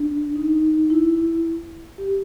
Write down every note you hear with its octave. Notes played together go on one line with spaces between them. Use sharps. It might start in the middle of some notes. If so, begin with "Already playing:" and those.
Already playing: D4
D#4
E4
G4